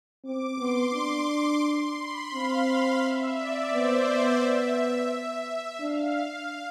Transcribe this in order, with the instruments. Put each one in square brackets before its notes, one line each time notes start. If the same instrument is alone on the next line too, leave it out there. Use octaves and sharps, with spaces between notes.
[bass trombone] C4 [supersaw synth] D6
[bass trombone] B3 [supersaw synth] C6
[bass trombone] D4
[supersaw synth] C6
B5
[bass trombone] C4 [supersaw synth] F5
[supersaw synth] E5
D5
[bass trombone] B3 [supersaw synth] C5
[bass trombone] B3 [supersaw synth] D5
[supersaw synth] E5
E5
[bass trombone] D4 [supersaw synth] F5